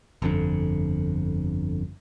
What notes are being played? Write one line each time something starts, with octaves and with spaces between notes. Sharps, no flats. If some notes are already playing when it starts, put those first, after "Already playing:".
G1 F2 D3